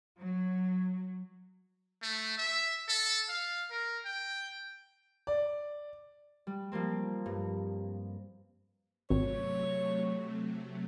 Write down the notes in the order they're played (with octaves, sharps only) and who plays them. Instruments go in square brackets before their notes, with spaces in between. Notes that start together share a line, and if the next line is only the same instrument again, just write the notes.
[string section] F#3
[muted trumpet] A3
E5
A4
F5
A#4
G5
[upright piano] D5
[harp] G3
F3 G3 A#3 C4
G2
[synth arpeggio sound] G#1 [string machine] C3 F#3 A3 [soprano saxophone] C#5